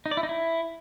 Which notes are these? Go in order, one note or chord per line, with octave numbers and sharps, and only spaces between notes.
D#4
D5
E4
D#4
E4